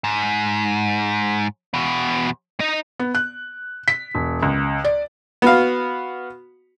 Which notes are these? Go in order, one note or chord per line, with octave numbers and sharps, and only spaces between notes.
G#2
E2 B2
D#4 D#5
B3
F#6
B6
E1
C#2
D5
B3 F#4 F5